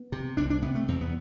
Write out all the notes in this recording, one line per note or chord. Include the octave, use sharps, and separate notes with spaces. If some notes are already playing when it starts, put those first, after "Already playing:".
Already playing: B3
C3
C2 D4
D4
C3 B3
A3
E2 C4
B3